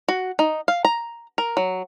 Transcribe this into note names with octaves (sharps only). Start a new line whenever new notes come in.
F#4
D#4
F5
A#5
A#4
F#3